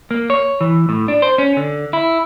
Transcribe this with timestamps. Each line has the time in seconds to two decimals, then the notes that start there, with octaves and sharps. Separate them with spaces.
0.11 A#3
0.30 C#5
0.61 E3
0.89 A2
1.08 D4
1.22 C5
1.38 C#4
1.57 D3
1.93 E4